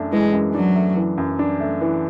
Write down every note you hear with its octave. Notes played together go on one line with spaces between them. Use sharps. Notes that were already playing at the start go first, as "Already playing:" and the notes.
Already playing: F#2 A3 D4
E3 G#3
F#2
F#3 D4
A3
E3
F#2
D4
A3
E3